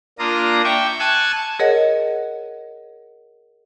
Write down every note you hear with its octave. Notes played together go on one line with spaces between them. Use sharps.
A#3 D4 F4 A#5 D#6
E5 G5 C#6 D6 E6
G#5 A5 C#6 E6 F#6 G#6
G#4 A#4 C#5 D#5 F#5